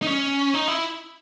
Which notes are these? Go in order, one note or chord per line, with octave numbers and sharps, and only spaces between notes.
D#4
C#4
D#4
E4